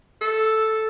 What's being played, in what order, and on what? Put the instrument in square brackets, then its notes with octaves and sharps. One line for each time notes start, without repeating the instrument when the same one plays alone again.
[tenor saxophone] A4